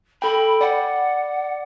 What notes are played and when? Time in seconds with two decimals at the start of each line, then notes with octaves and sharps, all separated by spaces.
0.22 A4 G5 B5
0.61 D5 F#5